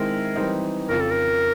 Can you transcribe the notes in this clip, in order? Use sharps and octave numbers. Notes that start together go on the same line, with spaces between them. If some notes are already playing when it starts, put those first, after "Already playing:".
Already playing: D#3 G#3 C4 E4 A#4
E3 G3 C4 D#4
F2 C#3 F3 A#4
A4
A#4